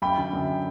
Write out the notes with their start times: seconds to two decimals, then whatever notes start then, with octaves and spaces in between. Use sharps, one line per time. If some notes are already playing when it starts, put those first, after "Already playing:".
0.02 F#2 G5 B5
0.18 D3
0.33 F#2